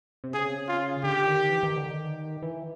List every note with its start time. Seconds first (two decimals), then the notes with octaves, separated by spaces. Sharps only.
0.24 C3
0.34 C#3 G#4
0.68 F4
1.04 D3 G4
1.26 D#3
1.50 E3
1.63 D#3
1.77 D3
1.90 D#3
2.42 E3